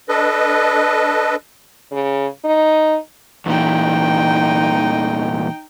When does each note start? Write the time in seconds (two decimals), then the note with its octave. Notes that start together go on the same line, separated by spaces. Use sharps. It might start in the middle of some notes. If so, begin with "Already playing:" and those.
0.09 D4 A4 B4 D#5
1.91 C#3
2.45 D#4
3.46 E2 A#2 E3 D#4 G5